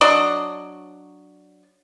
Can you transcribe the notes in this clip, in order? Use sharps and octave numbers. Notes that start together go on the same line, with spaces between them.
F#3 D4 D5 D#5